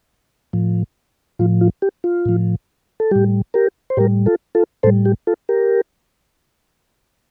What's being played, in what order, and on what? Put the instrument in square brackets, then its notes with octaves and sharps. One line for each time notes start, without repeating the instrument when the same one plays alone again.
[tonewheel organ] A2 F3
A2 F3 F4
F4
G4
F4
A2 F3
A4
A2 G3 G4
G4 A#4
C5
A2 G3 G4 A#4
F4 A4
F4 A4
A2 G3 A4 C5
G4
F4 A4
G4 A#4